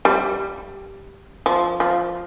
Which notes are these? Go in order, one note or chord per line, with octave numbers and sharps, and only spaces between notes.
G3
F3
F3